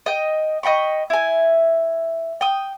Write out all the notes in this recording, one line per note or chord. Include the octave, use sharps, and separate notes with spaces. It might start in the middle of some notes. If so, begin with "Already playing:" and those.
D#5 G5
D#5 G5 B5 C#6
E4 G#5
G5 D#6